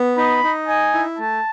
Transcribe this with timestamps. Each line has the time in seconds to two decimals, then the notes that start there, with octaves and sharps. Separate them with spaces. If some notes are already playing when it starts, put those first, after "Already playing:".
Already playing: B3
0.17 D#4 B5
0.43 D#4
0.68 D#5 G#5
0.94 E4
1.19 A3 A5